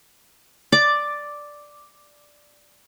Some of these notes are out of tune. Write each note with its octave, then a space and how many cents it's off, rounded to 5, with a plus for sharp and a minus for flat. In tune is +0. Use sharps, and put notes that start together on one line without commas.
D5 +0 D6 +5